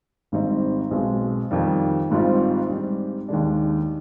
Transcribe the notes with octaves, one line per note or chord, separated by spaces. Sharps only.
G#1 G#2 G3 C4 D#4
B1 B2 G#3 C4
F2 D#3 G3
G#1 G#2 G3 C4 F4
G#2 G3 C4
D#2 D#3 G#3 D4